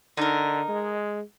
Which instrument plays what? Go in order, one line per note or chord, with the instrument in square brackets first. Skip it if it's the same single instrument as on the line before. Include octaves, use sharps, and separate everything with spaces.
[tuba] D3 [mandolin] D#4 A#4
[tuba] G#3